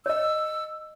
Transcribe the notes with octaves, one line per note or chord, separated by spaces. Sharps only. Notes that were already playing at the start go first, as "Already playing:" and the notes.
C#5 D#5 E6